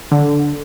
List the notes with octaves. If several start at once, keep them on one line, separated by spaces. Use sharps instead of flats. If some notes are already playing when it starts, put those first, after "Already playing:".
D3